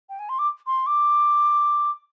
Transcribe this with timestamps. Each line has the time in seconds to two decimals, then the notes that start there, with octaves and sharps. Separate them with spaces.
0.09 G5
0.19 G#5
0.29 C6
0.39 D6
0.67 C6
0.87 D6